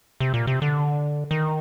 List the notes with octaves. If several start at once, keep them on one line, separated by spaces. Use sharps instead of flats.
C3
A#2
C3
D3
D#3